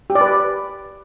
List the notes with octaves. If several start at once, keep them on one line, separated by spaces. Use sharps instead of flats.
G4
D5
B4